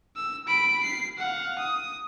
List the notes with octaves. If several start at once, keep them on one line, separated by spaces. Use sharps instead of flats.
E6
B5 D7
C7
F5 F#5
D#6